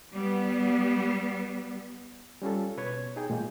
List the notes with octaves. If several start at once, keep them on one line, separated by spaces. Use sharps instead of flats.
G3 B3
G3 C#4 F4 A4
B2 B4 C#5 G#6
D#4 G#4 G5
A#2 G#3 A#3